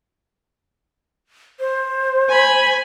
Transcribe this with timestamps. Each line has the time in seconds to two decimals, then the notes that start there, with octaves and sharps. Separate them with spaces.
1.60 C5
2.29 G#5 B5